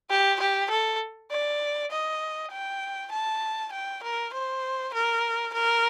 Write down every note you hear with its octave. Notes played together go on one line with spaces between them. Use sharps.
G4
G4
A4
D5
D#5
G5
A5
G5
A#4
C5
A#4
A#4